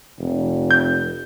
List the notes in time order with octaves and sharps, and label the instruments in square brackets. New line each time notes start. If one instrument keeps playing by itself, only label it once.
[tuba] F1
[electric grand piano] G6